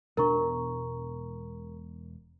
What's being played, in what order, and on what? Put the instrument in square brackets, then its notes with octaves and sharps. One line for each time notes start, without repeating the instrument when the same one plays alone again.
[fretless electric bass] E1 B2 D4 [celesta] A#4 A#5 C#6